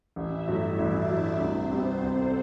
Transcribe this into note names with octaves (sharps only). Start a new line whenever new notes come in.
A1 E4 E5
G2 F#3 A3 E4 E5
A1 D4 D5
G2 F#3 A3
C2 C4 C5
C3 G3 B3 F#4
C2 A4